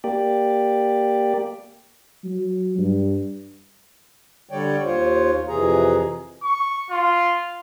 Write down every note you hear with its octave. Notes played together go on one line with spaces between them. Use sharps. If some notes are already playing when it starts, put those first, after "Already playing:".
A#3 G4 D5
F#3
G2
D3 G3 C#5 D5 G5
D#2 F4 C5 C#5
F2 C3 E3 G#4 A#5
C#6
F4